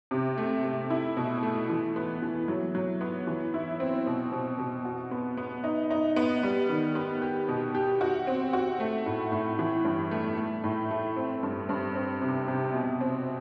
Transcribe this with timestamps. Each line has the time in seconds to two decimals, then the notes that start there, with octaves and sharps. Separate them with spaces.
0.11 C3
0.38 A3
0.64 A3
0.90 E4
1.17 B2
1.43 A3
1.69 E3
1.96 B3
2.22 E3
2.48 F#3
2.75 F#3
3.01 B3
3.27 E3
3.54 E4
3.80 C4
4.06 B2
4.32 B2
4.59 B2
4.85 F#4
5.11 B3
5.37 B3
5.64 D#4
5.90 D#4
6.16 B3
6.43 G3
6.69 D#3
6.95 B3
7.22 G4
7.48 B2
7.75 G4
8.01 F#4
8.27 C4
8.53 F#4
8.80 A3
9.06 A2
9.32 A2
9.59 E3
9.85 G2
10.11 A3
10.38 A3
10.64 A2
10.91 A3
11.16 C4
11.43 G2
11.69 G2
11.95 C4
12.21 C3
12.48 C3
12.74 B2
13.01 C4